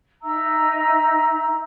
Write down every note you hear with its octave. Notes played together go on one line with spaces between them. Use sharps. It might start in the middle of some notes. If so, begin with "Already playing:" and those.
D#4 E5 A#5 E6